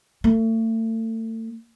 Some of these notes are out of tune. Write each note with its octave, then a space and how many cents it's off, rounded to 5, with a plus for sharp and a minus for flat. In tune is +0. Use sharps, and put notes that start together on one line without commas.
A3 +35